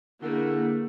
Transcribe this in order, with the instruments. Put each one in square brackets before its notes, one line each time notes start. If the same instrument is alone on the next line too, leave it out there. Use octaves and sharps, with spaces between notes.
[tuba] D3 [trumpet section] G3 A3 F#5 [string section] A#3 [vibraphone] E4 G#4